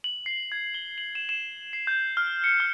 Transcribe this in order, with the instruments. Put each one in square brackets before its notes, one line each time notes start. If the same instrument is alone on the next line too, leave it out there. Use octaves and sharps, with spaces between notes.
[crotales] F#7
C7
G#6
G7
F#7
E7
E7
C7
G6
F6
C#7
F6